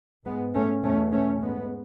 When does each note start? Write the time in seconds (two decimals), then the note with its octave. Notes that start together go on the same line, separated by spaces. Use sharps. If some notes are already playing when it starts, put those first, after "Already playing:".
0.25 G#2 G#3 B3
0.53 A3 C#4
0.83 E2 B2 A3 C#4
1.12 A3 C#4
1.41 G#2 G#3 B3